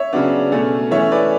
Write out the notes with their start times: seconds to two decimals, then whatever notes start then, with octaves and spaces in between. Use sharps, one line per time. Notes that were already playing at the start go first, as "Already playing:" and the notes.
Already playing: C#5 E5
0.13 C#3 F#3 B3 D4
0.51 B2 A3 C#4
0.91 E3 A3 C#4 C#5 E5
1.12 B4 D5